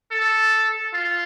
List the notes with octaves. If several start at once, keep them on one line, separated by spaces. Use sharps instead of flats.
A4
F4